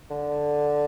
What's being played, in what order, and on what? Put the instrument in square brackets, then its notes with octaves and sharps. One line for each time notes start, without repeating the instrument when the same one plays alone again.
[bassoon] D3